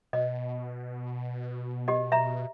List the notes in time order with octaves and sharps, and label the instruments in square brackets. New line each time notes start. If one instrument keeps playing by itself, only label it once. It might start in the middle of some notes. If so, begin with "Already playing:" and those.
[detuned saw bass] B2 [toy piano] D#5
[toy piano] G4 D#5
E5 A#5